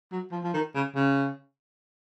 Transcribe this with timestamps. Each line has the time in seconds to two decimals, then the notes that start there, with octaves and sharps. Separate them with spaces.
0.12 F#3
0.32 F3
0.43 F3
0.54 D#3
0.75 C#3
0.96 C#3